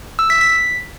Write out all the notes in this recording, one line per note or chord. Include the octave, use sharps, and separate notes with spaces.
E6
B6
B6